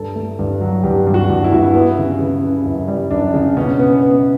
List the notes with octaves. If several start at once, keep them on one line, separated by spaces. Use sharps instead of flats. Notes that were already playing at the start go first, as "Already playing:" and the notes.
Already playing: G2 A4
A3
G2
F#3
G2 G4
G2
F#4
G2
E4
G2 F#4
E4
B3
C#3
C#3
C#3
F#2
G3
F#2 D4
C#3
B2 C#4
B3
B3